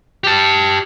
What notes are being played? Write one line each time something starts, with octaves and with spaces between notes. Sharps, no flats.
G4 A5